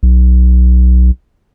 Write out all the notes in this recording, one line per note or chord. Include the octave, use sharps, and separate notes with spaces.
B1